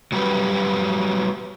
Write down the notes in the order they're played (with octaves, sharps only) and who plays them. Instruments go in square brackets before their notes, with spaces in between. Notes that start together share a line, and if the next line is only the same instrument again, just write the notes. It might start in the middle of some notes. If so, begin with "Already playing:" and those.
[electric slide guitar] F#3 G3 F#4 G4 B4